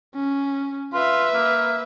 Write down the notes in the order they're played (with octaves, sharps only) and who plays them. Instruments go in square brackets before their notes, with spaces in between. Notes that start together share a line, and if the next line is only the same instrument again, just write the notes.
[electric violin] C#4
[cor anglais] F4 [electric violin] B4 E5
[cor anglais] A#3